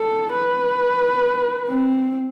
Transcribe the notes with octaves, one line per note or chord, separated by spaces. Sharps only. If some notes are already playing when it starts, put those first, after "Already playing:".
Already playing: A4
B4
C4